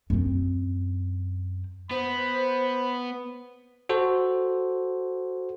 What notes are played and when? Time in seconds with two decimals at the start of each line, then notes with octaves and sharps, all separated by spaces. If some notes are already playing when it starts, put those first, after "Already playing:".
0.10 F#2 C4
1.91 B3 C5 B5
3.89 F#4 A4 C5